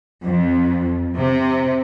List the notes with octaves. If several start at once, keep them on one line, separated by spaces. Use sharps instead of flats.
F2
C3